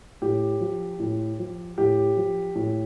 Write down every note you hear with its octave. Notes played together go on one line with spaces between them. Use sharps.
A2 G4
F3
A2
F3
A2 G4
F3
A2